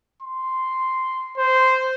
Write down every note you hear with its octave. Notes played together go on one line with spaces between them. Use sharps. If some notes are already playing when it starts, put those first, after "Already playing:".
C6
C5